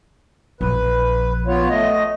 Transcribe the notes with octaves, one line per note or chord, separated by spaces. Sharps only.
A#1 F3 B4
B3 F4 C#5
A3 D#5